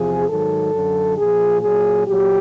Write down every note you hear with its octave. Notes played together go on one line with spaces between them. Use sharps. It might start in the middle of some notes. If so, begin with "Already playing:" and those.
Already playing: E2 C3 F3 G#4
G#2 D#3 F#3 A4
F#2 D3 F#3
A#2 F3 G#4
A#2 F#3 G#4
A#2 F#3 G4